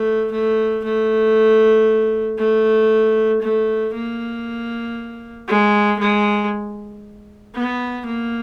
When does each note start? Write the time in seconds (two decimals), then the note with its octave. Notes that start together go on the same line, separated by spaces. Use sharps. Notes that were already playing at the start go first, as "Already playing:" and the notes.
Already playing: A3
0.31 A3
0.84 A3
2.38 A3
3.41 A3
3.93 A#3
5.48 G#3
5.99 G#3
7.55 B3
8.06 A#3